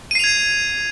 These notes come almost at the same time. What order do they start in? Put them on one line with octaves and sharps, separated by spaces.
D#7 C7 F7 G#6